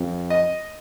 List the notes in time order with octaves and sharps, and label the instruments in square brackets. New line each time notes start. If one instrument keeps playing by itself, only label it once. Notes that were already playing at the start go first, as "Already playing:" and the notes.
Already playing: [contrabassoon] F2
[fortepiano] D#5